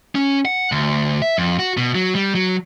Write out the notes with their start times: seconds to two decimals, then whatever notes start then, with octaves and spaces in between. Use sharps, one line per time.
0.15 C#4
0.45 F#5
0.72 D2
1.22 E5
1.38 F2
1.59 F#4
1.77 B2
1.95 F#3
2.15 G3
2.35 F#3